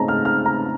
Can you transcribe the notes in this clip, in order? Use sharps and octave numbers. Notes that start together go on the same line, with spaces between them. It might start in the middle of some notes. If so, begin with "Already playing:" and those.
Already playing: C#3 A3 C4 D#4 A5 A#5
F6
F6
A#5